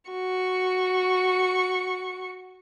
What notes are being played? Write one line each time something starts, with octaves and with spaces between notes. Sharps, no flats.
F#4 C#6